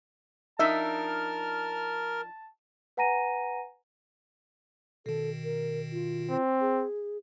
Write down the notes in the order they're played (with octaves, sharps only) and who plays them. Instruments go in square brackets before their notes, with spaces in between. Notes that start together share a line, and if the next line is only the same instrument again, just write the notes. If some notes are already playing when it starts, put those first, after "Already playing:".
[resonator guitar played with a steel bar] F3 D4 D#4 [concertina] A#4 F6 [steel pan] E5 [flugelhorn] A5
[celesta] B4 F#5 G#5 A#5 A#6 D#7
[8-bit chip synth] B2 D#3 [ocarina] A4
[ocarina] A#4
F4
[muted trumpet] C4
[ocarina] G#4